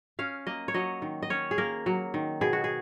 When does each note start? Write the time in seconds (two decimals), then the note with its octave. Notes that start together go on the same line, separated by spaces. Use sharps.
0.19 C#4 F5
0.47 A#3 D#5
0.68 C#5
0.74 F#3 D#5
1.02 D#3
1.23 D#5
1.30 C#4 C#5
1.51 G#4
1.58 A#3 A#4
1.86 F#3
2.14 D#3
2.41 B2 G#4
2.53 F#4
2.64 G#4